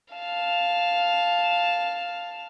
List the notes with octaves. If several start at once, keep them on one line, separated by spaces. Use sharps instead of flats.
F5 A5